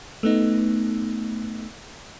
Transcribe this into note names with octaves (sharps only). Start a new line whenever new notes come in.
A3 B3 D#4